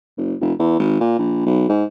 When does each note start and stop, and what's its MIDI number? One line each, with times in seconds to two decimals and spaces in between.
0.17 0.34 30
0.40 0.53 29
0.59 0.79 40
0.80 1.00 32
1.00 1.18 46
1.19 1.42 34
1.46 1.66 35
1.69 1.84 44